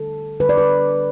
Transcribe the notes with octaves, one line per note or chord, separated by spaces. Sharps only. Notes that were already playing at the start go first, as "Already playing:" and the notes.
Already playing: D3 G3 A4
D3 G3 B4
D5
B4